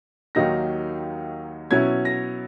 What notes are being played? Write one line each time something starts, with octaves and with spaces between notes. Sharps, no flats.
D#2 D#3 F#3 A#3 D#4 A#6
B2 F#3 C#4 E4 G#6
A#6